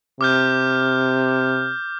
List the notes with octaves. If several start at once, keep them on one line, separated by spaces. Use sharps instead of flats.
C3 D6 F6 G6